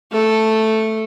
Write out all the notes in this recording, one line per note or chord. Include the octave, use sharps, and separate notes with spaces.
A3 A4